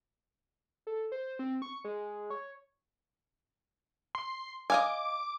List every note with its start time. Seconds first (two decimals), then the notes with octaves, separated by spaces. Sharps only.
0.87 A4
1.12 C5
1.39 C4
1.62 C#6
1.85 G#3
2.30 C#5
4.15 C6
4.70 D#5 F5 G#5 D6